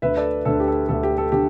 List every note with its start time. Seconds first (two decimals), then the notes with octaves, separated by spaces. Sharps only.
0.02 D2 D3 B4 E5
0.17 A4 D5
0.45 D2 D3 A4
0.60 G4
0.68 A4
0.89 D2 D3 A4
1.03 G4
1.18 A4
1.32 D3 G4